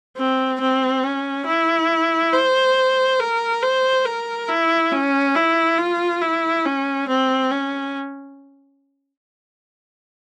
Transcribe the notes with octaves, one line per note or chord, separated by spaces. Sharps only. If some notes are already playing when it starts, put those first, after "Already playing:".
C4
C4
C#4
E4
C5
A#4
C5
A#4
E4
C#4
E4
F4
E4
C#4
C4
C#4